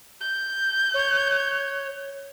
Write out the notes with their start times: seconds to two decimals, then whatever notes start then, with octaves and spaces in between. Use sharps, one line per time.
0.20 G6
0.94 C#5